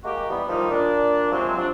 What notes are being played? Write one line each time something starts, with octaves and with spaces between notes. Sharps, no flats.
G#3 A#3 F#4 G4
E3 G3 B3
D#3 F3 G3 A#3 D#4
A#2 D4
C3 F3 F#3 G#3 C4
F3 D4